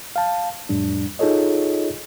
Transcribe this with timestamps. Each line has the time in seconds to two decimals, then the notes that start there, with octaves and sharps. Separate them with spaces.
0.16 F5 A5
0.69 F2 A2 G3 D4
1.19 D#4 F4 G#4 A4 C#5 D#5